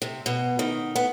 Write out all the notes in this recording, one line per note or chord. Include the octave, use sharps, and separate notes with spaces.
C3
B2
D#3
B3